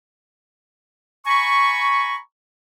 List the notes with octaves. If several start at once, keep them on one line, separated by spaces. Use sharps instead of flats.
G#5 A#5 B5 C#6